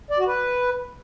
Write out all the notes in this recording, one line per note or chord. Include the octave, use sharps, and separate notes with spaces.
D5
F#4
B4